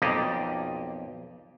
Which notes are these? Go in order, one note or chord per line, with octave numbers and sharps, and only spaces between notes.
B1 F2 A#3 G4 D5 D#5